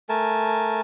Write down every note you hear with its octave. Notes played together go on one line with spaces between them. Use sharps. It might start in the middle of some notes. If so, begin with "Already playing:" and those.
A3 A#4 G#5 A5